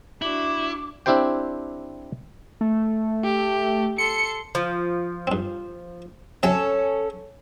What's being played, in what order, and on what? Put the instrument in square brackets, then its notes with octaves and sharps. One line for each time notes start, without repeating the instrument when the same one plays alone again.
[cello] D4 F#4 [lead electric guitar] E4 [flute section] D6
[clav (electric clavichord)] C4 D4 E4 G4 C5 G5
[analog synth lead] A3
[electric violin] G4
[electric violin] A4 C6 [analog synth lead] C#7
[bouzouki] F3
[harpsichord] G2 C4
[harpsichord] C3 F#3 [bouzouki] C#4 A4